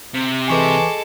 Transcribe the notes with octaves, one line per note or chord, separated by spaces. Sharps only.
C3
C#2 E3 G#3 A4 B4 G#5 C#6 D6